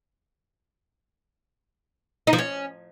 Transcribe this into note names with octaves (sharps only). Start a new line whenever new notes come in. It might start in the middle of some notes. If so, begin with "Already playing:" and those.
D#4
F3
C#4